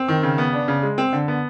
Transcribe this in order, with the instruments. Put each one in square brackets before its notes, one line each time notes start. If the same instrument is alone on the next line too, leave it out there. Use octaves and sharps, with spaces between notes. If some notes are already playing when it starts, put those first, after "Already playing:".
Already playing: [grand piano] C4
D#3
C#3
B3
D4
C#3
G#3
C4
D3
B3